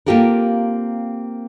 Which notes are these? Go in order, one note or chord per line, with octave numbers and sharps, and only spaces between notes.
A#3 C4 F4 G4 A4 A#4